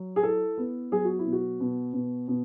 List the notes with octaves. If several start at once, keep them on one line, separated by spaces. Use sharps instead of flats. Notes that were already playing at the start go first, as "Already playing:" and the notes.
Already playing: F#3
G#4
E4 A4
B3
F#3 G#4
F#4
E4
B2
F#4
B2
B2
B2